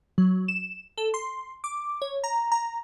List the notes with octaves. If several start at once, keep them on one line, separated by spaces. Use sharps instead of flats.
F#3
E7
A4
C6
D6
C#5
A#5
A#5